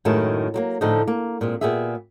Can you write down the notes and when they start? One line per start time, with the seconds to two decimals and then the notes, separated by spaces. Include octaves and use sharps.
0.05 F#2 A2 D#3 G#3 E4 A4
0.54 F#3 G#3 A#3
0.81 A2 D3 F3 A3 D#4
1.08 A#3
1.41 A#2 G#3 C4
1.61 A#2 B3 G4 G#4 E5